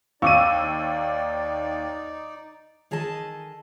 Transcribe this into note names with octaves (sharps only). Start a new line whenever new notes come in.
D#2 D#4 D5 F5 C#6 D6 E6 D#7
D#3 G#4 A4 D#5 A5